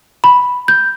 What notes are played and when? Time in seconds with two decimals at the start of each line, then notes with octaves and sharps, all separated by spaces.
0.24 B5
0.68 G6